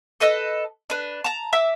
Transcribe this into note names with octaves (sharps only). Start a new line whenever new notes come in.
A4 B4 D#5 E6
D4 B4
A5 A#5
E5 D6 E6